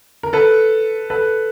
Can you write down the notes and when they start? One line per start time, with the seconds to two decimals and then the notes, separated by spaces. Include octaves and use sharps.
0.23 A#4
0.33 A4 B4
1.10 A4 B4